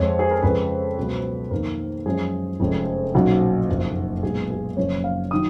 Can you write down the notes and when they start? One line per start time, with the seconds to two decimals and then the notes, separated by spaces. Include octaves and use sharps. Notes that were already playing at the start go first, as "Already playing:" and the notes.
Already playing: F2 F3 G#3 C#5
0.19 G#4
0.31 A#4
0.42 F2 C#3 G#3 B4
0.98 C#2 B2 F#3
1.51 F2 D#3 A#3 A#4
2.06 F#2 F3 G#3 C#4 G#4
2.60 F1 F2 F3 G#3 C#4
3.14 B1 A#2 F#3 C#4 F#4
3.69 F#1 F2 F3 A#3
4.23 B1 A#2 G#3 B3 G#4
4.51 G#4
4.77 F#1 F#2 C#3 F3 A#3 C#5
5.04 F5
5.31 D#3 F#3 D#6